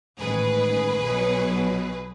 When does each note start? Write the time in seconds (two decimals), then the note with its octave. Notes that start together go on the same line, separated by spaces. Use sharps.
0.19 A1 G#2 D#3 G#4 B4
1.03 B1 B2 F#3